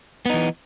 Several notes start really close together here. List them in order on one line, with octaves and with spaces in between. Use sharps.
B3 D#4 E3